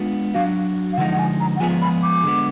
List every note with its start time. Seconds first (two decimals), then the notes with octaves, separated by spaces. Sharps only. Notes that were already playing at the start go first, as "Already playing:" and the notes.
Already playing: G#3 B3 D4 F4
0.34 F#3 D4 F#4 F5
0.93 F5
0.97 D3 F3 G#3 D#4 F#5
1.13 F#5
1.19 G#5
1.40 A#5
1.56 F#5
1.60 F3 G#3 B3 F4 G#4 G#5
1.82 B5
2.03 D6
2.24 D3 G#3 B3